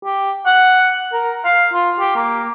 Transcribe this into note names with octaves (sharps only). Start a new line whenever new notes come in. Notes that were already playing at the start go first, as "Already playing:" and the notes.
G4
F#5
A#4
F5
F4
G4
A#3